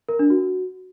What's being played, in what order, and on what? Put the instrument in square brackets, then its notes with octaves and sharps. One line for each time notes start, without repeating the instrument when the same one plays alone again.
[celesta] A#4
D4
F#4